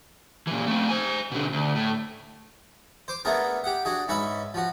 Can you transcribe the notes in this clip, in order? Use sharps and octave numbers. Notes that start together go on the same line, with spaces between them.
A#2 E3
A3 C4
C5 G#5
B2 D3
D2
A2
C5 C6 D6
A3 B3 D4 G#4 A#4
G4 F#5
D4 F#4 G#4
G#2 C#4 B4 E5 B5
F3 F#4